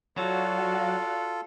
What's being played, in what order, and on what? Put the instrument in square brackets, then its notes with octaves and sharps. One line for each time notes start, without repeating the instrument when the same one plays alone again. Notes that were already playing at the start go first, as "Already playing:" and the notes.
[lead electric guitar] F#3 [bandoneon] F4 A4 [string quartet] F#4 D5 F5